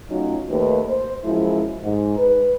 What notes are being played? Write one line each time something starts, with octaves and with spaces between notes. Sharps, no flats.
F#3 A3 C#4 D#4 F4 F#4
D#2 A3 B4
C5
F#2 F3 G#3 E4
G#2
B4